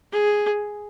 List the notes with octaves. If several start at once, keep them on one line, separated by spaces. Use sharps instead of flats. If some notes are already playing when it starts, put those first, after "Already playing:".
G#4